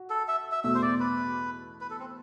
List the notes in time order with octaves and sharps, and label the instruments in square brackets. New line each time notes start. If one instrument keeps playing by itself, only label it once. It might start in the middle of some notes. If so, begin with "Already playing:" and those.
Already playing: [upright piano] F#4
[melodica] A4
E5
E5
[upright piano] E2 B2 A3 [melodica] E5
[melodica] C5
D5
B4
B4
A4
C4